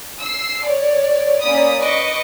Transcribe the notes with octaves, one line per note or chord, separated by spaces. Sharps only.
E6 C7
C#5 D5
A#3 C#4 D5 B5 D#6
B4 D#5 C#6 D6